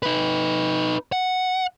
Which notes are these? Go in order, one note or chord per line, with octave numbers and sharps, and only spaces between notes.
D#4 B4
F#5